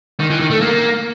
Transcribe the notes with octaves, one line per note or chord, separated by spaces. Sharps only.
D#3
E3
D#3
A3
A#3